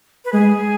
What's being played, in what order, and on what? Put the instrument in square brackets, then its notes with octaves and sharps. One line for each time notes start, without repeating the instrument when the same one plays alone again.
[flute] B4
[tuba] G#3 [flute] G#4